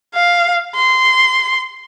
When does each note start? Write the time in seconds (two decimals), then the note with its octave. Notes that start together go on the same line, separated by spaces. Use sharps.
0.15 F5
0.76 C6